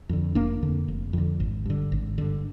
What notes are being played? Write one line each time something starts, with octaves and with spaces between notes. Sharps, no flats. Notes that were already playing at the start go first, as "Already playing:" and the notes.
F2 D3
F1 A#3 D4
F2 D3
F1
F2 D3
G#1
G2 D3
G#1
G2 D3